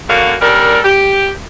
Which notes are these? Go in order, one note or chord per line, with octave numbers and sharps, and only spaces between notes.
F#2 D3 F#3 A#3 F#4 F5
G3 C#4 D4 A4 A#4
G4